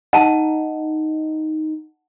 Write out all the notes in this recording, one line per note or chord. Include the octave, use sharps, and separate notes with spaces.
D#4 F#5 A5